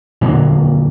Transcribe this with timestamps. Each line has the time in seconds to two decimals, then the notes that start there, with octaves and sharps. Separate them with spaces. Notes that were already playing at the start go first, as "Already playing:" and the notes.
0.21 A#2 D3 F#3 A#3